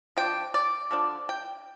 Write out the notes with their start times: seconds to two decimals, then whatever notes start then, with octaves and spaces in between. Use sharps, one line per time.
0.17 F3 D4 G5
0.54 D5
0.91 D3 F3 D4
1.29 G5